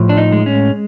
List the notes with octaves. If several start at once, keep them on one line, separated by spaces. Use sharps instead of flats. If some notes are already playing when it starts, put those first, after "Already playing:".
Already playing: A2 F3
D4
D#4
G#3
C#4